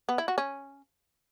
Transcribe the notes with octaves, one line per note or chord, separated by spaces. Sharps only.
B3
E4
F#4
C#4